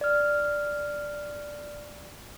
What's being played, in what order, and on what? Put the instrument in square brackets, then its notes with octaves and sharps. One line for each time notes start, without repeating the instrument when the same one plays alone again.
[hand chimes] D5 F6